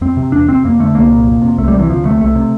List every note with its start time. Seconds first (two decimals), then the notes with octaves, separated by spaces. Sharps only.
0.01 F2 C4
0.17 C3
0.32 E2 D4
0.49 C3 C4
0.65 F2 A#3
0.79 D3 A3
0.95 C2 A#3
1.10 A#2
1.26 F2
1.42 C3
1.58 C2 A3
1.68 G3
1.74 C3
1.79 E3
1.89 D2 F3
2.05 C3 A3
2.21 C2 A3
2.35 C3